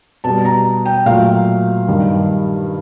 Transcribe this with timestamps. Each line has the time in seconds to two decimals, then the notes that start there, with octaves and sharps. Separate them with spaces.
0.24 B2 G3 A5
0.45 A#5
0.86 G5
1.06 A#2 F#3 A3 F5
1.88 G2 D#3 G3